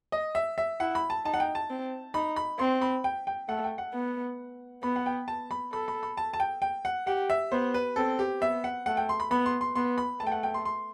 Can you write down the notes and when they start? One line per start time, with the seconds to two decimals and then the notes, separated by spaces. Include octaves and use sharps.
0.12 D#5
0.35 E5
0.58 E5
0.80 E4 F#5
0.95 B5
1.10 A5
1.25 D#4 A5
1.34 F#5
1.40 G5
1.55 A5
1.70 C4
2.14 D#4 B5
2.36 B5
2.59 C4 C6
2.82 B5
3.04 G5
3.27 G5
3.49 A3 F#5
3.64 G5
3.78 F#5
3.94 B3
4.83 B3 B5
4.96 F#5
5.06 G5
5.28 A5
5.51 B5
5.73 A4 B5
5.88 B5
6.03 B5
6.17 A5
6.33 A5
6.40 G5
6.62 G5
6.85 F#5
7.07 G4 F#5
7.30 E5
7.52 B3 C5
7.74 B4
7.96 C4 A4
8.19 G4
8.41 B3 E5
8.64 F#5
8.86 A3 F#5
8.97 G5
9.09 C6
9.20 B5
9.31 B3 B5
9.46 C6
9.61 C6
9.75 B3 C6
9.98 B5
10.20 A3 A5
10.27 G5
10.32 F#5
10.43 G5
10.54 C6
10.65 C6